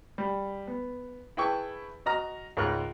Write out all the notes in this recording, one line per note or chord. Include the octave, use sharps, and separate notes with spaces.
G3
B3
E4 G#4 B4 G5 A5 C#6
F#4 D#5 A#5 F6
C#2 G#2 A#4 C#6 F6 F#6